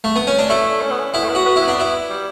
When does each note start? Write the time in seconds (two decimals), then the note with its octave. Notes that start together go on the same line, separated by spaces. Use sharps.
0.04 A3
0.16 B3
0.27 C#4
0.39 D4
0.49 A3 E4
0.81 C#4
0.91 B3
0.99 C#4
1.13 B3 E4
1.24 A3
1.29 B3
1.35 F#4
1.46 B3
1.56 E4
1.62 B3
1.68 D4
1.77 B3 E4
2.10 G3